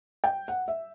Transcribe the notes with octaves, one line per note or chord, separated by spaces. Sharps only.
G5
F#5
E5